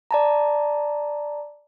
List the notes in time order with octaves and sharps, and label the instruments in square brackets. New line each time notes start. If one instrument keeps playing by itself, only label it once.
[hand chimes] D5 A5 A#5